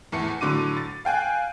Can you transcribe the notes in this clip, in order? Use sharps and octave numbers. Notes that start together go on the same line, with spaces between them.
E2 A2 A3 C#7
A2 D3 F#3 D6 D#7
A6
F5 G5 G#5 F#6